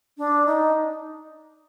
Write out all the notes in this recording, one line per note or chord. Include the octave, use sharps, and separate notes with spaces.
D4
D#4